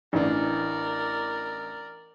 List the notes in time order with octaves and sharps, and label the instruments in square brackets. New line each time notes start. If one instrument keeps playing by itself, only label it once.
[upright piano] A1 E3 D4 [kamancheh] A#4 D5